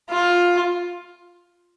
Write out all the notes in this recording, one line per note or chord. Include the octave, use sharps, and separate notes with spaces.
F4